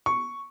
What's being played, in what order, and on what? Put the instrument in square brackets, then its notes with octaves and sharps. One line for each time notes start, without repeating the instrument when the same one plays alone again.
[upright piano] C#6